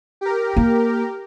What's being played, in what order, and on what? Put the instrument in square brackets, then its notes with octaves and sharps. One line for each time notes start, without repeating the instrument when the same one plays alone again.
[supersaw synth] G4 A#4
[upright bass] A#3